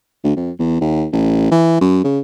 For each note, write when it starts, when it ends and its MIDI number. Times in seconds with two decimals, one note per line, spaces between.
0.24 0.34 38
0.36 0.51 41
0.59 0.77 40
0.81 1.06 39
1.13 1.50 33
1.51 1.77 52
1.81 2.01 42
2.04 2.20 49